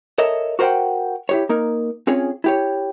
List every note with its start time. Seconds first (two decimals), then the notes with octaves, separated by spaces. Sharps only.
0.18 A4 A#4 C#5 D#5 E5
0.59 F#4 A#4 C5 D5 F#5 G5
1.29 E4 G4 C#5
1.49 A#3 D#4 A#4
2.07 C4 C#4 F4 G#4 C#5
2.44 E4 G4 C#5